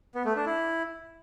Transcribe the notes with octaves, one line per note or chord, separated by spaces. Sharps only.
B3
A3
D4
E4